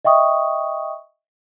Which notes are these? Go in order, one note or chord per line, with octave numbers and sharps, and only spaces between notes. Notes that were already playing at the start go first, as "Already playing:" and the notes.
D#5 E5 G5 C#6 D#6